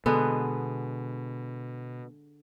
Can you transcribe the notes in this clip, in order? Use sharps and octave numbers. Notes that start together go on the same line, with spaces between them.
B2 D3 G#3 B3